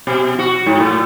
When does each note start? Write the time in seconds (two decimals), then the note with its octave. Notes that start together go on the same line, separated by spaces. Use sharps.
0.07 B2
0.39 F#4
0.66 G#2
0.80 A2